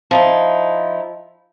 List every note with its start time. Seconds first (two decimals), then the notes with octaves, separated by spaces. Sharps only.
0.11 F3 D#4 E4